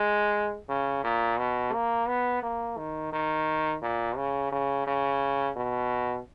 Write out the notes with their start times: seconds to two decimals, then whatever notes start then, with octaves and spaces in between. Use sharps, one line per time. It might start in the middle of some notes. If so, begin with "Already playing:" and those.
Already playing: G#3
0.69 C#3
1.04 A#2
1.39 B2
1.73 A#3
2.08 B3
2.43 A#3
2.77 D#3
3.13 D#3
3.82 A#2
4.17 C#3
4.52 C#3
4.87 C#3
5.56 B2